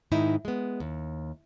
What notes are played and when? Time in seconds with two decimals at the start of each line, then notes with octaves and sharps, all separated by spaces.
0.12 G#2 D#3 D#4 E4
0.45 G#3 B3
0.80 D#2